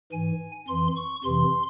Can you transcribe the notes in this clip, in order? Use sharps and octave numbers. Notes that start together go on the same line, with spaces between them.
G#2 E3 G#5
F2 E3 C6
C#6
F2 C3 E3 C6